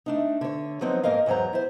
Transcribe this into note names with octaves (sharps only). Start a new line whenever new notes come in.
A3 D4 D#4
D3 C#5
F3 F#3 B3 C4 D#4
G#2 A#3 A#4 D#5 F5
E2 G#2 F#3 C5 A#5
E4 C5